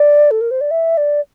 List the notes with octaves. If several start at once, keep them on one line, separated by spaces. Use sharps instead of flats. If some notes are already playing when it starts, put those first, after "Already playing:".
Already playing: D5
A4
A#4
C5
D5
E5
D5